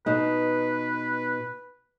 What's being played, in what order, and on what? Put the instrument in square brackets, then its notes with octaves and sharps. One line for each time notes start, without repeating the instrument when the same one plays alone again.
[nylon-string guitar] B2 D#4 [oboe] B4